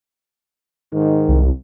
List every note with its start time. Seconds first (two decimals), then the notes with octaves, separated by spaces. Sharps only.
0.92 G#2 D#3
1.29 C2